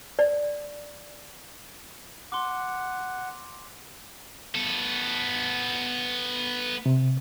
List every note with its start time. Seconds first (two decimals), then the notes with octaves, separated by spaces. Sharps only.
0.19 D5
2.32 F#5 C6 D6
4.55 B3 A4
6.86 C3